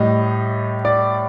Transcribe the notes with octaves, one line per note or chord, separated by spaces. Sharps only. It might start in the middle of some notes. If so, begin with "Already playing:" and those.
Already playing: A2 G3 D#5
D5